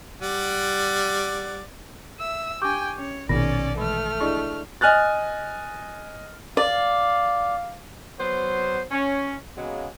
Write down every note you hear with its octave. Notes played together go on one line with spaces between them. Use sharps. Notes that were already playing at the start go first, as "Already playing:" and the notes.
G3 D5 F#5
E5 E6
D4 G4 G5 G#5 C#6 D6 G6
C#4 C#5
A#1 B2 D#3 C#4 D#4 G#4 D5 A#6
E3 G#3 A3 F6
D4 E4 G#4 D5 D#5 C#6
D#5 G#5 F6 F#6 A6
D5 F5
F#3 B3 C5
C#4
C#3 F#3 G#3 A#3 B3